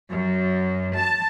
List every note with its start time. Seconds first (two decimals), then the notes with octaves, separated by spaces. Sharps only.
0.10 F#2
0.97 A5